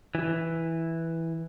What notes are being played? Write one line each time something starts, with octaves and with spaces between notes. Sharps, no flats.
E3